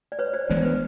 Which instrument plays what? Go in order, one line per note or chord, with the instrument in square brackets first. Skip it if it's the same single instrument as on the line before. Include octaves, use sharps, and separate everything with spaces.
[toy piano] D5
B4 C#5
C5 D5
[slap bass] E3 G#3 B3 D4 [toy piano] C5
[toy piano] B4